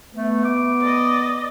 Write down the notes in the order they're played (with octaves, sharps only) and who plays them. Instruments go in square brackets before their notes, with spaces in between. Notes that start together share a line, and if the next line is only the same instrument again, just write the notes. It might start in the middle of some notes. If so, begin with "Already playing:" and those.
[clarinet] A3 [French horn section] B3
[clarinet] D6
[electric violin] D5 D#5